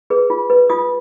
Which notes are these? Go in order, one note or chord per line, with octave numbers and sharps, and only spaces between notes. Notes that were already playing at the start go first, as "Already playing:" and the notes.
G#4 B4
F4
B4
F4 D#6